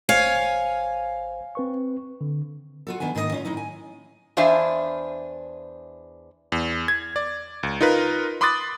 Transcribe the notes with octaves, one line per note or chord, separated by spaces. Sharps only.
G#1 C5 C#5 F5 G#5
C4 B4 C#6
D3
F4 F#4 A4
D#3 B3 D4 G#5
G#2 D3 D#3 A#3 A4 D#5
C#4 F4
A2 D#3 D#4 E4
G#5
E2 D4 C5 E5 F5 G#5
E2
G#6
D5
C#2
D#4 F4 A#4 B4
B5 C6 D6 D#6 F#6 A6